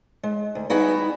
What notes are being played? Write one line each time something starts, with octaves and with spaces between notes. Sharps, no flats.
G#3
D2
G3 B3 D#4 E4 F#4 G#4